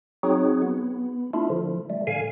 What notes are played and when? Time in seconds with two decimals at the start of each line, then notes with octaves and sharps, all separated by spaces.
0.23 F#3 C4 D#4 F#4 G#4
0.62 B3
1.34 A3 D4 E4 F4
1.50 D3 F3
1.90 G3 A3
2.07 A2 D3 F5 G#5